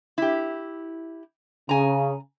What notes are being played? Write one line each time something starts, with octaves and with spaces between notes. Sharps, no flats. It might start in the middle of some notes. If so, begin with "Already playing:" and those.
E4 G4
C#3 G#5 A#5